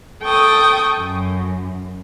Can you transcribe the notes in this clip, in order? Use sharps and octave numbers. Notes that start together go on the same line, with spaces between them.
A4 G5 C#6 D#6
F#2